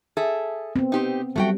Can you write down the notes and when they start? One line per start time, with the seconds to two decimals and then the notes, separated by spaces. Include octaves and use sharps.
0.17 G#4 A4 E5
0.76 B3 C4
0.92 D#4 G4 C5
1.36 F#3 G3 A3 F#4 G5